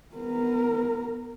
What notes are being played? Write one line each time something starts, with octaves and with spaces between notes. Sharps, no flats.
B3 A#4